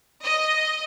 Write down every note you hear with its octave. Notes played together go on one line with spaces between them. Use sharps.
D#5